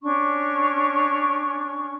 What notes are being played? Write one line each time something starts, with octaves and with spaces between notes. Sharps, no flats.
C#4 D4 C#6